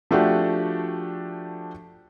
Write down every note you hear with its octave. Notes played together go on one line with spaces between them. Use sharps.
F3 A3 D4 F#4 G4